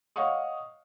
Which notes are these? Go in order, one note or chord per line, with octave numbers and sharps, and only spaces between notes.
C#5 D#5 F5 F#5 C#6 D#6